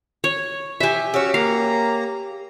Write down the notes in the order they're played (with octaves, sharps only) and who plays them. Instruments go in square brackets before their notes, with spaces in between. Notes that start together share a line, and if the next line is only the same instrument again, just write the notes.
[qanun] C#5
[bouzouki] E3 G4 [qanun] E5 G#5
[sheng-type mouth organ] C#4 F#4 E6 [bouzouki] G4 C#5
[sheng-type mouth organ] A#3 A#5 [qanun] F5